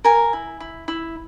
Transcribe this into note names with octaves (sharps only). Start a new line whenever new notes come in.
A#4 G#5
E4
E4
E4